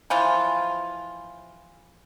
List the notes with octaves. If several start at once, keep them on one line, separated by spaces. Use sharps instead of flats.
E3 F3 F4